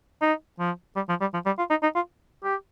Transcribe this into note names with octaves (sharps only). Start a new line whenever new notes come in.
D#4
F3
G3
F3
G3
F3
G3
F4
D#4
D#4
F4
G4